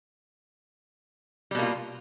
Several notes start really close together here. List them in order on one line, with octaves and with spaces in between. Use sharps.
G3 B2 A#3 F4